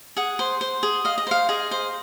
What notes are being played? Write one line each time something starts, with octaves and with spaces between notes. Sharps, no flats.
G#4 F#5
C5
C5
G#4
D#5 F5
D#5
C5 F5
G#4 D#5
C5